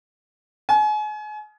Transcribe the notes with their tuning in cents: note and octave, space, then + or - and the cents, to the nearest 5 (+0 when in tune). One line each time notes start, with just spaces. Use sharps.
G#5 +35